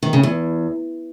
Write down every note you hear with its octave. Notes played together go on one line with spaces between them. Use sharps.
D#3
C#3
E2